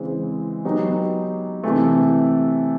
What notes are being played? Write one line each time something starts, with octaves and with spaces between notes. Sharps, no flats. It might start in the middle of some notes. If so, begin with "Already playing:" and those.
Already playing: C#3 E3 G#3 C4
F#3 B3 D#4 G4
C3 E3 A3